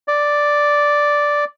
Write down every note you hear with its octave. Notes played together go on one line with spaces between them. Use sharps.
D5